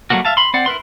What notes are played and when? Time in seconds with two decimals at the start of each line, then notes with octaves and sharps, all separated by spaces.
0.10 F#3 G3 A3 A#3 F#4
0.25 E5 F5 A5
0.37 B5 C6
0.54 C4 D5 F#5
0.66 E4 A#4 B4 C6